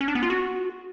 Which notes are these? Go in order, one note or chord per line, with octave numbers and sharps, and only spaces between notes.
C#4
D4
B3
F4
F#4